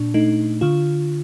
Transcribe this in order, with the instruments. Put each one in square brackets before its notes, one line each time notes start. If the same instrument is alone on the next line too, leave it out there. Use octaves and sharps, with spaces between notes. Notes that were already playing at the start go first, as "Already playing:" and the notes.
Already playing: [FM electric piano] A#2 D4
A3 D#4
D3 F4